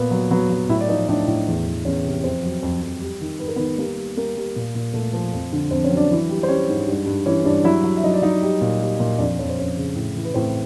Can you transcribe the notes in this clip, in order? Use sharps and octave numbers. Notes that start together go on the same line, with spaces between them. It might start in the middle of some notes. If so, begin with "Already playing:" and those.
Already playing: A#2 B3 B4
F#3
F#3 B3 B4
F#3
A2 E4 E5
D5
F3 D#4 D#5
A2 D4 D5
A2
E2
E2
E2 C#4 C#5
C3
F2 C4 C5
F#3
F2
F2
G3
D#3
G#2 B4
A#4
B3 B4
D#3
G3 A#3 A#4
G3
G3 A#3 A#4
G3
A#2
A#2
A#2 A3 A4
F3
F2
D3
F2 C4 C5
C#4 C#5
F#3
D4 D5
E3
G3
C5
G3 C#4 C#5
G#2
G2
G2
E3 C#4 C#5
G2 D4 D5
F#3 E4 E5
F#3
E5
F#3 D#4 D#5
D5
F#3 D#4 D#5
G3
A#2
G3
A#2
F2 D4 D5
F2 C#5
C5
F2 C#4 C#5
C#3
A2
E3
B4
A2 C4 C5